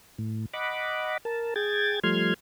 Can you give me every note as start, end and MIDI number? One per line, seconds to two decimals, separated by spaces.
0.18 0.46 45
0.54 1.17 75
0.54 1.17 78
0.54 1.17 83
0.54 1.17 86
1.25 1.54 70
1.25 1.54 81
1.56 2.00 68
1.56 2.00 79
1.56 2.00 92
1.56 2.00 93
2.03 2.34 53
2.03 2.34 55
2.03 2.34 57
2.03 2.34 84
2.03 2.34 89
2.03 2.34 92